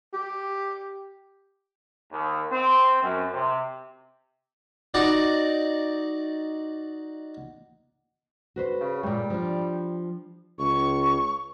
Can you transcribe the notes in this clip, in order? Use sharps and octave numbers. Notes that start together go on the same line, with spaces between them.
G4
D#2
C4
F#2
C3
D#4 F#4 D5
F#4 B4 C5
C#3
A#2 G3 G#3
F3 D4
C#2 C#6